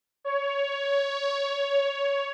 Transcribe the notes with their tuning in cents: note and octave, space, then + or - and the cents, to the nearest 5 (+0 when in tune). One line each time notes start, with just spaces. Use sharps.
C#5 +15